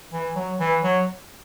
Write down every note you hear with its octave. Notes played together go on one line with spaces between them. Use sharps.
E3
F#3
E3
F#3